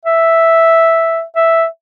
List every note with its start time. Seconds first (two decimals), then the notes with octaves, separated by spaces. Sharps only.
0.05 E5
1.36 E5